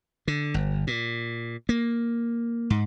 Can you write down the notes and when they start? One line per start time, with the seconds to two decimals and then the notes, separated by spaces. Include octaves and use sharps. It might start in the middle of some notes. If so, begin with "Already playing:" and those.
0.28 D3
0.54 G1
0.87 A#2
1.69 A#3
2.70 G#2